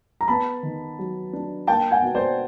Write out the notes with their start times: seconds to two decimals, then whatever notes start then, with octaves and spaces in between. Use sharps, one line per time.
0.21 A#5
0.28 B3 A5 B5
0.63 D#3
0.99 F#3
1.33 D4
1.67 A#3 G5 A5
1.91 F#5 G#5
2.02 B2
2.15 C5 D5